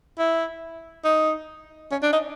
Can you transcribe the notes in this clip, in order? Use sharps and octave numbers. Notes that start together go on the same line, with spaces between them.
E4
D#4
C#4
D4
D#4